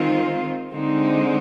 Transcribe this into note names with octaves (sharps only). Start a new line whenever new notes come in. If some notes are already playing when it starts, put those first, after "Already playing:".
Already playing: D#3 G#3 C4 F4
D3 G#3 C4 D#4